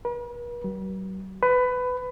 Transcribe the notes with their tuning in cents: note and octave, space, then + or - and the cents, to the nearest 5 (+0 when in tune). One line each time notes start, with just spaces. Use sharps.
B4 -45
F#3 +45
B4 +20